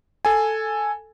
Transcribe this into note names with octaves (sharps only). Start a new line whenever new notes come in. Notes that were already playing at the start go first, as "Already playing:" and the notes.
A4 G#5